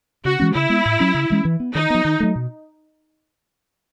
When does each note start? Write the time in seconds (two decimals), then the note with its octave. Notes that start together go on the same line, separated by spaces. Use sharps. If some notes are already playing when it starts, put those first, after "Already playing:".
0.25 C#3 F#4
0.40 E3 G#3 C#4
0.54 C#3 E4
0.70 G#3 B3
0.86 A2
1.00 F#3 C#4
1.14 C#3
1.30 E3 G#3 C#4
1.45 E3
1.60 B3
1.75 D#3 D#4
1.90 F#3 B3
2.05 D#3
2.20 F#3 A3
2.36 B2